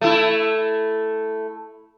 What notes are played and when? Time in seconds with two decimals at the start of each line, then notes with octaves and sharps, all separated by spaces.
0.01 A3 E4